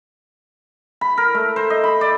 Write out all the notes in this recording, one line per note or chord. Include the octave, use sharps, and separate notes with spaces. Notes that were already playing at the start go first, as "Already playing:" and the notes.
B5
A#4
A3
C5
D#5
B5
D5